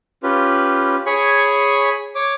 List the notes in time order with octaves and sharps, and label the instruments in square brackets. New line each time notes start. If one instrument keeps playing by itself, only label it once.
[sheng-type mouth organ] C#4 F4 G4 B4
G#4 C#5 G#5 B5 C#6
C#5 D6